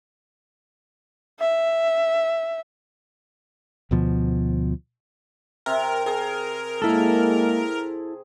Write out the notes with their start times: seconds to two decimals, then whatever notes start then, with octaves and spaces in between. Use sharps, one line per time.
1.39 E5
3.91 D2 B2 F3
5.66 C3 A#4
6.06 G#4 A#4
6.82 G#3 A#3 E4 A4